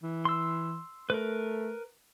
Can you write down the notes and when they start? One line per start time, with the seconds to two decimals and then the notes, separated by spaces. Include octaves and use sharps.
0.03 E3
0.25 C6 E6
1.10 A3 A#4 B4